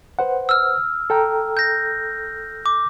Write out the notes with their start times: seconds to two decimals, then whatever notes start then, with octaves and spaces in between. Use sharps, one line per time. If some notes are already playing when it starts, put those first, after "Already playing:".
0.19 B4 C5 F#5
0.49 E6 F6
1.10 A4 G5 A#5
1.57 G6 A#6
2.66 D6